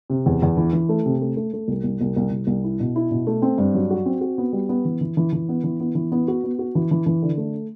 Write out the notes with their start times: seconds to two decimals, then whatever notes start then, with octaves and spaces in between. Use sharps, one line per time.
0.10 C3
0.26 E2
0.42 E2
0.57 E3
0.73 E3
0.89 A3
1.06 C3
1.22 A3
1.37 A3
1.53 A3
1.68 C2
1.84 C2
2.01 C2
2.16 C2
2.31 C2
2.47 C2
2.64 E4
2.80 B2
2.96 E4
3.11 B2
3.27 A3
3.42 C4
3.58 G2
3.75 F#3
3.91 F#4
4.06 C4
4.21 F#4
4.38 B3
4.53 G3
4.69 B3
4.85 E3
5.01 E3
5.17 E3
5.32 E3
5.49 B3
5.64 E3
5.80 B3
5.95 E3
6.12 B3
6.28 F#4
6.43 B3
6.59 F#4
6.75 E3
6.91 E3
7.06 E3
7.22 D3
7.37 A3